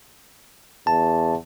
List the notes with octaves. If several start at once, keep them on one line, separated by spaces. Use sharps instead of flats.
E2 A5